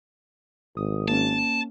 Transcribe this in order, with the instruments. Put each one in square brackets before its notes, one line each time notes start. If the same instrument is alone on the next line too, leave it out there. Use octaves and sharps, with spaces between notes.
[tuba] G#1 [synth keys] D#6
[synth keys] A#3 C#4 [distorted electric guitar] A5